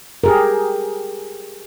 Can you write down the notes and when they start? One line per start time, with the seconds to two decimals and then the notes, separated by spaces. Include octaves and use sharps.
0.24 G4 G#4 A#4